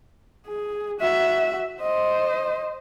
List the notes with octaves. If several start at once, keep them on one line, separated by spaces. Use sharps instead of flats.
G#4
F#4 E5
C5 D#5